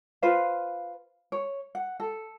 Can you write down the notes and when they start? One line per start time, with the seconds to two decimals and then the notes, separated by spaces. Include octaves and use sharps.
0.22 F4 B4 C5 F5
1.32 C#5
1.75 F#5
2.00 A4